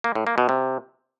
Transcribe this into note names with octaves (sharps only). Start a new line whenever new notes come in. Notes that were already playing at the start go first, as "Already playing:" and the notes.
A#3
A2
A#3
B2
C3